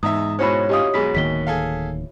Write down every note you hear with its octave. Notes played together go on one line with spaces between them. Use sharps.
E2 G#2 D#4 E5 D#6
B2 G#3 C#4 E4 F#4 C5 C#5 B5
G#1 C#4 F4 G4 D#5 D#6
F#2 B2 G#3 G#4 B5 B6
D1 D#3 A#3 B6 G7
G#4 A4 F5